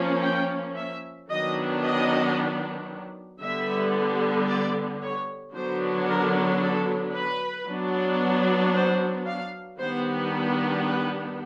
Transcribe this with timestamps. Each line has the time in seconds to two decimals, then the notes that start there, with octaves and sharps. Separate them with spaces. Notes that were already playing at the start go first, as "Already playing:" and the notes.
Already playing: F3 A#3 C#4
0.22 G5
0.76 E5
1.28 D#3 F#3 B3 D4 D#5
1.83 D#5
3.41 D3 G3 B3 E5
4.47 D5
5.02 C#5
5.54 D3 F#3 B3 D4 C5
6.08 A#4
6.61 A4
7.13 B4
7.67 F#3 B3 D4
8.74 C5
9.26 F5
9.79 D#3 G3 B3 D4 C5
10.86 B4